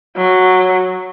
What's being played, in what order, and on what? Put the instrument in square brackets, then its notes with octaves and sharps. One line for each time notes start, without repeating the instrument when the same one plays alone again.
[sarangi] F#3